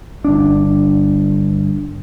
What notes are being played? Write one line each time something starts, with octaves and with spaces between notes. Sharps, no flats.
G1 D4